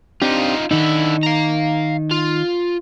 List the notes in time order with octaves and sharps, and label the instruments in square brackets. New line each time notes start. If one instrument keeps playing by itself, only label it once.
[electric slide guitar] C4 D4 G4 [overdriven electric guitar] D#4 F4
[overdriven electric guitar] D3 E4 [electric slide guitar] D#3 D#4
[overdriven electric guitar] F5 A#5
F4